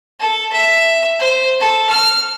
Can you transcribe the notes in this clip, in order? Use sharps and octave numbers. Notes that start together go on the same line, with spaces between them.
A4
E5
C5
A4
F6